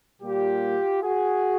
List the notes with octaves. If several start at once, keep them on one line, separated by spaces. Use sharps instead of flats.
A#2 G3 A#3 F4 G4
F#4 G#4